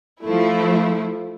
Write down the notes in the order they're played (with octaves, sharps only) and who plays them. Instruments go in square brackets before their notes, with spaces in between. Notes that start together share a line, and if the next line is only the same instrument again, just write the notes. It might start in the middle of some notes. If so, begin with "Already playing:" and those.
[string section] F3 A3 E4